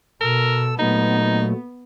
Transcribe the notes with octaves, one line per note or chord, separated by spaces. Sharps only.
B2 A4 A#4 E6
A#2 F#3 A3 B3 D#4